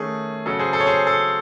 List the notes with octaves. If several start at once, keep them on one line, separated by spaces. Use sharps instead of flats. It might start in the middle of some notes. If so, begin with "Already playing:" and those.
Already playing: D#3 A3 C#4 G#4
C#3 F#3 C#4 A4
G#4 C5
A4
C#5
G#4 C5
A4